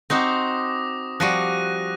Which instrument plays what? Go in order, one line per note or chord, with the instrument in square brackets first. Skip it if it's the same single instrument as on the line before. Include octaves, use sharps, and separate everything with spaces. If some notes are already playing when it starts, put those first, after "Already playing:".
[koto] C4 D#4 F#4 [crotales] D6 D#6 A#6
[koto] F3 G3 F#4 [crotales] F#6 A#6 D#7